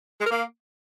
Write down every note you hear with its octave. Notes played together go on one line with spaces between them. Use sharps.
G#3
A#4
A#3